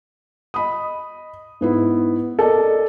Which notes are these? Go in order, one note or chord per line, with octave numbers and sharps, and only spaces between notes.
D#5 B5 D#6
G#2 B3 E4
A4 A#4 D5 D#5